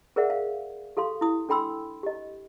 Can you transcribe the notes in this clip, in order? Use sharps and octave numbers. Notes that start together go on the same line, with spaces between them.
G#4 A#4 C5 D5 E5 F#5
F5
G4 A4 F5 C6
E4 D#6
D4 A4 G5 B5 C6 E6
G4 D#5